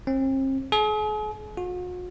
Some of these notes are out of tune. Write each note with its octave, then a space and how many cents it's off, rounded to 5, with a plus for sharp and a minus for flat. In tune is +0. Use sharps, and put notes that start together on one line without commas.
C4 +40
G#4 +40
F#4 -45